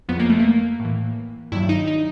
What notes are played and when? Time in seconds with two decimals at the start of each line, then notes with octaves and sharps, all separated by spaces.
0.09 F2 C#3 F3 B3
0.19 A#3
0.30 A3
0.40 A#3
0.80 A2 E3
1.52 G2 D#3 F#3 E4
1.69 D#4
1.88 D#4